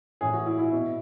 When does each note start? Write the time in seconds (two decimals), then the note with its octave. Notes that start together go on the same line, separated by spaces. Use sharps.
0.21 A2 E3 G#4
0.33 F#4
0.46 E4
0.59 E4
0.72 B2